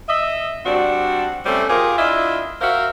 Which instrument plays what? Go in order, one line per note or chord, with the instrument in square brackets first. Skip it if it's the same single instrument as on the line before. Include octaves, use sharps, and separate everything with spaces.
[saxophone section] D#5 E5
G3 C4 D4 F#4
C3 G3 A3 C#4 C5
F4 G4 G#4 A#4
D4 E4 F4 D#5 E5
F#4 A#4 C5 E5 F5